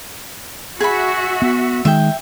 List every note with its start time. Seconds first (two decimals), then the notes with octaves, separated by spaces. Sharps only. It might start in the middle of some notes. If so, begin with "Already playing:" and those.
0.80 F#4 G#4 E5 B5
1.42 B3
1.85 D#3 G#3 E5 G5